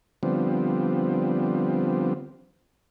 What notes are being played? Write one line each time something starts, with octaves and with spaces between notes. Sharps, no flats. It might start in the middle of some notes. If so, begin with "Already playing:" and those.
D3 F3 G3 B3 C4